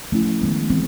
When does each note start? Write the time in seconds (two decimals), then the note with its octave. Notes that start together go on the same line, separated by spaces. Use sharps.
0.12 F3 A3 C#4 E4
0.41 D#3 G#3 B3
0.70 E3 G#3 C4